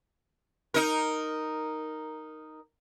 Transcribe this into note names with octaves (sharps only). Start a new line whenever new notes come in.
D#4 A#4